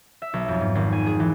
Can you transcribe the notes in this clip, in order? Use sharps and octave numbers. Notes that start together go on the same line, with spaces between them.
E5
B1
F2
G#2
G#1
G#5
G#4
E3